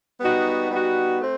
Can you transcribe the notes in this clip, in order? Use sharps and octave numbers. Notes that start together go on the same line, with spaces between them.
G3 B3 D#4 F#4
G3 B3 D#4 F#4
A3 C4